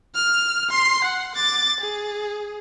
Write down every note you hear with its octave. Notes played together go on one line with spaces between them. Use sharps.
F6
C6 C7
F#5
D6 A6
G#4